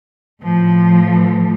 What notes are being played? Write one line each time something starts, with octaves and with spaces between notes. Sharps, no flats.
A2 F3